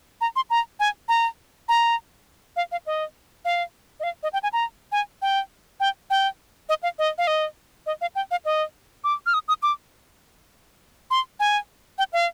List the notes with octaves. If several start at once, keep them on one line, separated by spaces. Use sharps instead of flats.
A#5
C6
A#5
G#5
A#5
A#5
F5
F5
D#5
F5
D#5
F5
D#5
G5
G#5
A#5
G#5
G5
G5
G5
D#5
F5
D#5
F5
D#5
D#5
F5
G5
F5
D#5
D6
F6
D#6
D#6
D6
C6
G#5
G5
F5